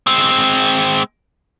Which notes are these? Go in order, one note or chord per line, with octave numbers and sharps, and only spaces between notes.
G#3 C4